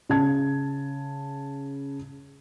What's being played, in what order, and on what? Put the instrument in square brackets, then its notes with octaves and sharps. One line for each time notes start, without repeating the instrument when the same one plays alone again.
[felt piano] C#3 A5 G#6